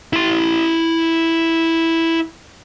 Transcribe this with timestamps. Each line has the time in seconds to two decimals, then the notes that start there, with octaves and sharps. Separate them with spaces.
0.13 E4 C6